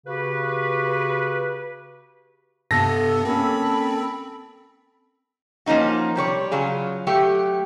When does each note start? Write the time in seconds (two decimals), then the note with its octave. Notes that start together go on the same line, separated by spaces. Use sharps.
0.07 C#3 F#4 G4 B4
2.71 G2 C3 B3 A4 A#6
3.25 A#3 C4 C#4 B5
5.66 F3 A#3 C#4 D#4 F#4
6.16 C3 G3 C#5 D5
6.51 C#3 F#3 F4 G#4
7.07 F#3 A3 G4